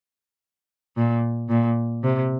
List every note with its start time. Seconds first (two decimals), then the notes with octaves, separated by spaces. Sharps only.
0.97 A#2
1.50 A#2
2.03 C3